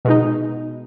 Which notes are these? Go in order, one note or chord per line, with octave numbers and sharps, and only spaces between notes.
B2 G#3 D#4